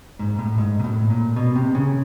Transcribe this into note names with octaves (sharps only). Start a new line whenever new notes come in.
G#2
A2
G#2
A#2
A2
A#2
B2
C3
C#3